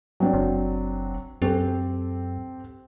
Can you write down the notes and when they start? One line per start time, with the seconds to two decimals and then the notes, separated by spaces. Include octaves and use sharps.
0.20 F#3 C4 D4
0.34 F#1
1.42 F#2 C4 G4 A4